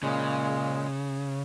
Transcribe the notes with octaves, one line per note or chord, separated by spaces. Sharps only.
A#2 C#3 G#3